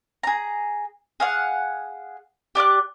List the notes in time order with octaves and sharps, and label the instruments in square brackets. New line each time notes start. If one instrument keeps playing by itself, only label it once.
[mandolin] G#4 A#5
G#4 F5 F#5
G4 D5 D6 F#6